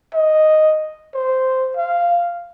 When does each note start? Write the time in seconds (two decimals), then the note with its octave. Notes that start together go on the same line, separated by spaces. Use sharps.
0.14 D#5
1.14 C5
1.77 F5